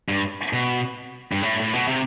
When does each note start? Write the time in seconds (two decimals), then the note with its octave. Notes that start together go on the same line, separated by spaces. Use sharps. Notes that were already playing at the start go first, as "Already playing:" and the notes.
0.09 G2
0.53 B2
1.32 G2
1.42 A2
1.60 A2
1.73 B2
1.88 C3